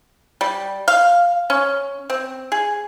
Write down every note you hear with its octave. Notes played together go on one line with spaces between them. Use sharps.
G3
F5
C#4
C4
G#4